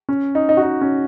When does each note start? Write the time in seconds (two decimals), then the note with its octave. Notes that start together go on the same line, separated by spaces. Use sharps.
0.09 C#4
0.35 D#4
0.49 D#4
0.57 F#4
0.63 D#4
0.81 C#4